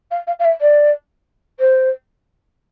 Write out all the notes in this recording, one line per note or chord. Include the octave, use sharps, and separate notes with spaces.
F5
F5
F5
E5
D5
C5